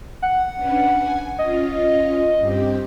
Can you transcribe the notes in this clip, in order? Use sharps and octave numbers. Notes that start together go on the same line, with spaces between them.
F#5
C#4 D4 B4
G#5
C#4 F4 D#5
G2 C4 G4